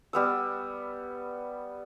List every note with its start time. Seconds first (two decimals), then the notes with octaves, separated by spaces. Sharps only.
0.13 G3 B3 E6